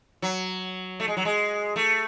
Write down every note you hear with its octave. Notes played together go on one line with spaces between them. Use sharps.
F#3
A3
G#3
F#3
G#3
A3